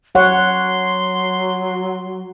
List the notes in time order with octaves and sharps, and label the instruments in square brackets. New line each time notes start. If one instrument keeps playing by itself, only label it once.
[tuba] F#3 [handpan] C#5 F#5 [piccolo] C6